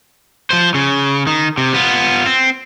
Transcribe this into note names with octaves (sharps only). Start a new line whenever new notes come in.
F3 C5
C#3
D#3
C3
B3 F4
C4